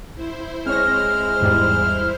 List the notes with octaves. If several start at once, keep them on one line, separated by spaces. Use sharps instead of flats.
E4 C5
G#3 C4 C#5 F6 A#6
E2 G#2 G3